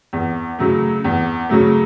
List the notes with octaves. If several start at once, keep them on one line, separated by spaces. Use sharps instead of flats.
E2
C#3 F#3 A3
E2
C#3 F#3 A3